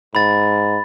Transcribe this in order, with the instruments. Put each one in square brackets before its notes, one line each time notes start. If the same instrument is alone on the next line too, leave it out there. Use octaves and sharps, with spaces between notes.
[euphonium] G#2 [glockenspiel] B5 A6